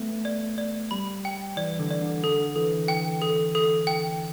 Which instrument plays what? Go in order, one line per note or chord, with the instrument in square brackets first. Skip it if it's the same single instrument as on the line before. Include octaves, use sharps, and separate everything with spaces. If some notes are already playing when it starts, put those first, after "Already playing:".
Already playing: [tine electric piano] A3 B3
[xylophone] D5
D5
[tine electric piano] G3 [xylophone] B5
[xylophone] G5
[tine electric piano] E3 [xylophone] D5
[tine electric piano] D3
[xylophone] D5
[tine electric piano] D3
[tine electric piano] D3 [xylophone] A4
[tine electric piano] E3 [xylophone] A4
[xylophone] G5
A4
A4
G5